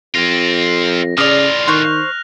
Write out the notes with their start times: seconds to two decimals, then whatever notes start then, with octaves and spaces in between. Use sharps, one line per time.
0.15 F2 C4 F4 A#6
1.18 A2 C#3 F4 D5 D#6 F6 A#6 F7
1.68 D#3 C5 C#6 F#6